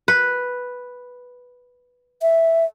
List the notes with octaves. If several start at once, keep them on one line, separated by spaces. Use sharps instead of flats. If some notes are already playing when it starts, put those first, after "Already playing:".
B4
E5